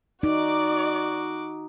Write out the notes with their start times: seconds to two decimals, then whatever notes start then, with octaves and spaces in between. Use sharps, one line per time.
0.23 D#4 F#4 D5 D6